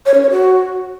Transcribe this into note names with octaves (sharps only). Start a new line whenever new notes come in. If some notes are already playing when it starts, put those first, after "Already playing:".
C#5
C#4
C#5
F#4